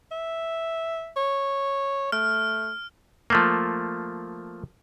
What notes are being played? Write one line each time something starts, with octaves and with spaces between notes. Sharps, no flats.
E5
C#5
A3 F6
F3 A3 A#3